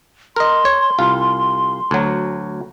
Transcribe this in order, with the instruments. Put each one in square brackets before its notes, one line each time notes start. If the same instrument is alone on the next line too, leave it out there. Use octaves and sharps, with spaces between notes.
[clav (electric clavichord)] A#4 D#5 [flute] C6
[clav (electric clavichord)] C#5
C2 F4
D2 F#3